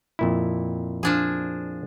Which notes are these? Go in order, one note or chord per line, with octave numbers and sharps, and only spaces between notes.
F2 A#2 E4
F3 D4 G#4